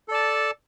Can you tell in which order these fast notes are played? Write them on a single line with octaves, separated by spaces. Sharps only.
A4 D5 A5